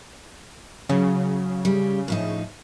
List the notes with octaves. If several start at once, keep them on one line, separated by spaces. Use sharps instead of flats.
C#3 F#3
G3
A2 F3 D#4